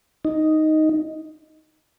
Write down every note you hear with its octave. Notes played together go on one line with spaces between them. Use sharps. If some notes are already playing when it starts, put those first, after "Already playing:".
D#4